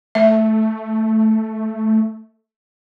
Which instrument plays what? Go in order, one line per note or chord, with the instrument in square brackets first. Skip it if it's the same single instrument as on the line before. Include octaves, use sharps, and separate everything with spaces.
[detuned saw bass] A3 [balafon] E5